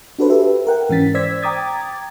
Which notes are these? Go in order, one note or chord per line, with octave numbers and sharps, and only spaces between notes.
D4 F#4 A4 B4 C5
G4 A4 B4 E5
A#4 F#5 G5
G#2 E3 C#4 A6 B6
C5 D5 E6 G#6 B6
G5 A#5 D6 D#6 G#6 A6